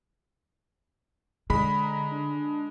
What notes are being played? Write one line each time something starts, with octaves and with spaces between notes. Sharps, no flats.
D3 G#3 B5
A#5
D4